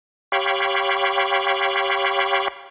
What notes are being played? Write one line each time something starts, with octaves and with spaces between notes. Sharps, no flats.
G4 C#5 F5 G5 B5 C#6